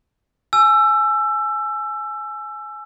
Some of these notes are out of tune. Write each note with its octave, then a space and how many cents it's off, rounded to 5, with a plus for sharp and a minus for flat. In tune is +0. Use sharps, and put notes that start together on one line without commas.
G#5 +20 E6 +20